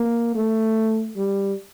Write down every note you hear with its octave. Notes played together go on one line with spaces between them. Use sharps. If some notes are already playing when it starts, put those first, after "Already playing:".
Already playing: A#3
A3
G3